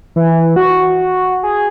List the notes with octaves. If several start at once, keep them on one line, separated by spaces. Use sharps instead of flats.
E3
F#4
G#4